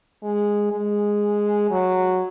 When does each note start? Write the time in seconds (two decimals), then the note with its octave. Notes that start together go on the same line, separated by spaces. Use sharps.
0.23 G#3
0.72 G#3
1.71 F#3